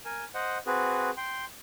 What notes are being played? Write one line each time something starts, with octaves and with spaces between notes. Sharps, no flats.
A#4 G#5
C5 D#5 F#5
C4 F#4 G#4 B4
G5 C6